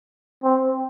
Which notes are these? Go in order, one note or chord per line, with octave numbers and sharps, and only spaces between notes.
C4